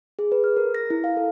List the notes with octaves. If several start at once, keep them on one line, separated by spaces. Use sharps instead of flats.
G#4
B4
F6
A#4
A#6
E4
F5
A4